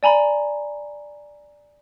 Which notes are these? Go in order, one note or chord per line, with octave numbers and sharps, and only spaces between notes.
D5 G#5 A#5 B5